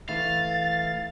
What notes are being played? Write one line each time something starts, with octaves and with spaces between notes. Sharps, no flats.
E3 A3 E4 F5 A6